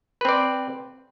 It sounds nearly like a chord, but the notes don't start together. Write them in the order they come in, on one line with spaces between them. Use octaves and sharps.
B4 C4 D5